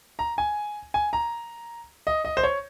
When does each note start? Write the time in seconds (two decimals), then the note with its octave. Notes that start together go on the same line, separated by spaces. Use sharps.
0.19 A#5
0.38 G#5
0.94 G#5
1.13 A#5
2.07 D#5
2.25 D#5
2.37 C5
2.43 C#5